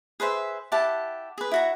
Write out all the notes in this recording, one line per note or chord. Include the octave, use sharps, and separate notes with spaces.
G#4 B4 C5 E5
E4 G4 F#5 A5
G#4 B4
E4 F#4 A#5